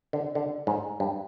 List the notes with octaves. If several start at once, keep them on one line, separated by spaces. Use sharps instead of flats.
D3
D3
G#2
G2